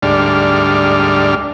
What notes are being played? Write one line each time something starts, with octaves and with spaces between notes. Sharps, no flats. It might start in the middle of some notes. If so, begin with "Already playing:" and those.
D2 G#2 G3 D4 F6